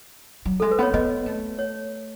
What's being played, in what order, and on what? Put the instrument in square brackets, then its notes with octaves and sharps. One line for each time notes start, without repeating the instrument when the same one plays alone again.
[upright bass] F#3
[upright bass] G#3 [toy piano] A4
[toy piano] B4
[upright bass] B3 [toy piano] C#5
[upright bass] B3 [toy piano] D#5
[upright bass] A3
[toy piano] C#5